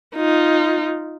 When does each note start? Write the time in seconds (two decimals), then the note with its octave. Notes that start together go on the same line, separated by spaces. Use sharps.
0.16 D#4 F4